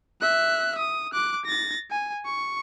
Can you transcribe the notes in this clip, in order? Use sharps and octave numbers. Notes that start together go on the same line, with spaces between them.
E5 F#6
D#6
D6 F#6
A6 A#6
G#5
C#6